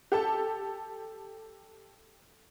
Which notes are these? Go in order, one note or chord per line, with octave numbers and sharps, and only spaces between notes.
G4 A4 A5